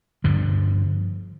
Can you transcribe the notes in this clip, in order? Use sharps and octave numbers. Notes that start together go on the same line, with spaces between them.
G2 D3 F3